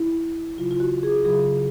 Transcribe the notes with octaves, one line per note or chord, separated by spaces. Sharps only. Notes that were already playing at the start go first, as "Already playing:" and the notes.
Already playing: E4
C#3 F#3 F4
F4
F#4
G#4
C#3 F#3 G#4